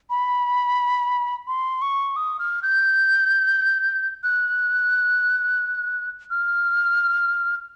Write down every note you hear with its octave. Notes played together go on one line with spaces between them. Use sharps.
B5
C6
C#6
D#6
F6
G6
F#6
F6